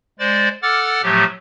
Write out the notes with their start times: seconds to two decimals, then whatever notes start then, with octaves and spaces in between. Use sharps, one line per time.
0.19 G#3 C5 D5 A6
0.62 A4 F#5 D6 F6 A6
1.03 A2 F3 F#3 A3 G4